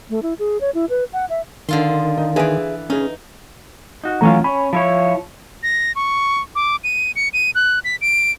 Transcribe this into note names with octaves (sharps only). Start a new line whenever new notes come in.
A3
E4
G#4
C#5
E4
B4
F#5
E5
D3 D#3 F4 C6
D#4
E3 G#4 D5 E5 G#5
C#4 D#4 G#4
D#4 F#4
E3 F#3 A3 C#4 F4 A#5
C#4 B5
F3 E4 C#5
A#6
C#6
D6
D#7
C#7
D#7
F#6
B6
D7